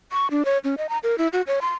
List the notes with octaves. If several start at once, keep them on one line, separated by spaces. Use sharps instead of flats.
C#6
D4
C#5
C#4
D#5
A#5
A#4
E4
F#4
C#5
C6